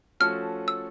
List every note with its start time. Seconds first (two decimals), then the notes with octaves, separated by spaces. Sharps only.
0.20 F3 A3 C#4 F#4 A4 F6
0.68 E6